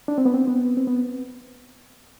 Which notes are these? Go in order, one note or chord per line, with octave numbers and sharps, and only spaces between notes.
D4
C4
B3
C4
B3
C4
B3